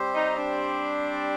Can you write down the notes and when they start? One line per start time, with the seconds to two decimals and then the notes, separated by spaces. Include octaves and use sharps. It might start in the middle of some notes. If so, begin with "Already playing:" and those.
Already playing: G3 C4 G4 C5
0.15 D#4
0.37 D4